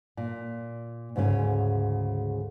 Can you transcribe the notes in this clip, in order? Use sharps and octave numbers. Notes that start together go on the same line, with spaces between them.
A#2
D2 G#2 C#3 C#4